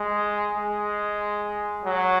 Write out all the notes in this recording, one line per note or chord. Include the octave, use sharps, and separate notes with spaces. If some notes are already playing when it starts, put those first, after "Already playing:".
Already playing: G#3
G#3
F#3